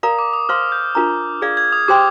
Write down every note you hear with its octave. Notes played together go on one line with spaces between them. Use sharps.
A#4 D5 F5 A#5 D#6
D6
D#6
C5 F5 C6 F6
G6
D4 F4 A#4 D#5 A#5
G#4 D5 F5 G#6
G#6
D#6
G4 C5 G5 C6 D6